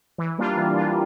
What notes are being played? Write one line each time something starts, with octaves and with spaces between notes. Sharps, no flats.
E3
G3 A#3 D4 F4
E3
G3 A#3 D4 F4